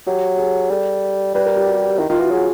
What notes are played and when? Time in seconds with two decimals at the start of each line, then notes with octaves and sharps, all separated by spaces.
0.06 F#3 G4
0.38 G#4
0.70 G3 A4
1.34 G3 B4
1.46 A#4
1.56 G4
1.66 F#4
1.98 D#3 E4
2.09 D#3 F4
2.20 E3 F#4
2.31 F#3 G#4